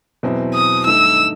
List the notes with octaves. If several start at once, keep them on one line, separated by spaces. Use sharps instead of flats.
E2 B2 F#3 C4 E4
D#6
G2 D#3 A3 D#4 E6